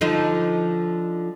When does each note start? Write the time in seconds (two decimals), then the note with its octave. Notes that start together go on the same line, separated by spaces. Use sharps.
0.01 D3 F3 D#4